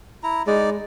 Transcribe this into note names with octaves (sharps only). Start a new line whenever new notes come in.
E4 A#5
G#3 D#4 D5